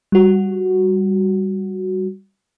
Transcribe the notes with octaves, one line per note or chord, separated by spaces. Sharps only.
G3 F#4